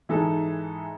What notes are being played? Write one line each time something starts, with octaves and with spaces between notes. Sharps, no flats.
G#2 E3 G#3 D#4 A4